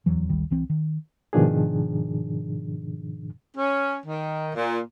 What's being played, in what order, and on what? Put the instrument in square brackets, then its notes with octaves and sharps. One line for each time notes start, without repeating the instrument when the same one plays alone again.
[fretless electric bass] D1 E2 E3 F#3
G#1 D2 D#3 G3
C2 E3 C4
D#3
[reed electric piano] G#2 B2 D#3 F3 D4 G#4
[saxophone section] C#4
D#3
A#2